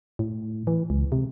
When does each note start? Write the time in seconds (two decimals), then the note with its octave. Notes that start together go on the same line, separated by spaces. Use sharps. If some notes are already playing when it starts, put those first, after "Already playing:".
0.19 A2
0.67 E3
0.90 C#2
1.12 C3